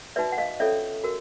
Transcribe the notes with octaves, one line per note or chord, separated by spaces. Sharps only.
D#4 F#4 B4 D5 E5
F#5
D#5 F5
C#4 F4 A4 C#5 D5 E5
F#4 A#4